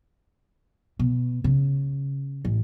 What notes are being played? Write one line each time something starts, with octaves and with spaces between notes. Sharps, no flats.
B2
C#3
A1